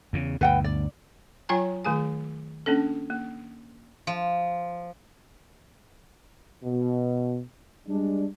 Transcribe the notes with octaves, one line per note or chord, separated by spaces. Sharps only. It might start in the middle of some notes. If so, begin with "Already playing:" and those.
E2 C#3
D2 G2 B2 B4 F#5 G5
D5
F#3 F4 C#5 G5 G#5 A#5
D#3 A3 G#4 G#5
A#3 C#4 D4 A4
A#3
F3
B2
G3 G#3 D4